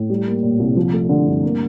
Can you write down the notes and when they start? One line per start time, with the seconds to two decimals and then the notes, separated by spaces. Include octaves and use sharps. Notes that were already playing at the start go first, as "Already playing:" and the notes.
Already playing: A2
0.10 G3
0.26 A#3
0.43 A#2
0.59 C2
0.77 F3
0.93 A3
1.09 D3
1.27 G2
1.43 A#3